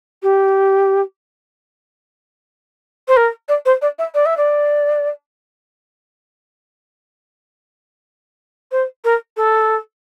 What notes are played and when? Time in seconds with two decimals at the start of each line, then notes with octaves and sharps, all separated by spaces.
0.23 G4
3.08 C5
3.17 A#4
3.48 D5
3.65 C5
3.82 D5
3.99 E5
4.14 D5
4.26 E5
4.37 D5
8.72 C5
9.04 A#4
9.37 A4